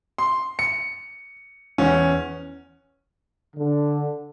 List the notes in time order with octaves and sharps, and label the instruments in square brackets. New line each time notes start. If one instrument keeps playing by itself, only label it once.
[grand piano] C6
C#7
E2 C#4
[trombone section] D3